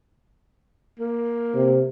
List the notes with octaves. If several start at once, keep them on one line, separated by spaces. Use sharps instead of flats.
A#3
C3